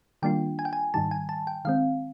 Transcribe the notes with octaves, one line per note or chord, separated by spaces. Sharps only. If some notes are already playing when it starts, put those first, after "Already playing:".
D#3 G3 A#3 D4 F4 G5
G#5
G5
G#5
G#2 D#3 G3 A5
G#5
A5
G5
D#3 G#3 C4 F5